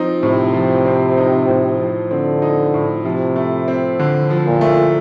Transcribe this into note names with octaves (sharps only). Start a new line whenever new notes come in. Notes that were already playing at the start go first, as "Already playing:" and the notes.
Already playing: F3 C4 D#4
A2 C3
F3
C4
D#4
A2
F3
D3 C4
D#4
A2
C3 F3
A3
C4
D3
F3
A#2
A3